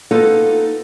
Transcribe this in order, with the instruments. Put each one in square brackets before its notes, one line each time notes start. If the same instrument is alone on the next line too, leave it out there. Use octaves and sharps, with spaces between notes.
[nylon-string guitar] A#3 B3 D#4 F4 A4 B4